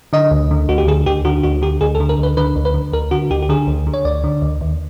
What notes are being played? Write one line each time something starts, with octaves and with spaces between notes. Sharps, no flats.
D3 D#5
D2
D3
D2 F#4
G4
D3 G#4
D2 G4
D3 F#4
D2 F#4
D3 G4
D2 G#4
A4
D3
A#4
D2 B4
D3 B4
D2
B4
D3
D2 A#4
D3 F#4
D2 G4
G4
D3 G#4
D2
D3
C#5
D2 D5
D3
D2
D#2